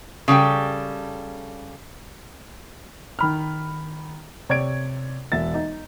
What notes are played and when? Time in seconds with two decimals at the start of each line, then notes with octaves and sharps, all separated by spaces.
0.28 C#3 G3 A4 G5
3.19 D#3 B5 F6
4.49 C3 C#5 D5 G#6 D7
5.32 E1 E5 A6
5.54 D#4